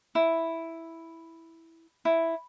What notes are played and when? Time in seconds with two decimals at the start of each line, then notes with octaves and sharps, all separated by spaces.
0.15 E4
2.05 E4